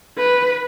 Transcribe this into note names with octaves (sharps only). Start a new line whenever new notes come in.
B4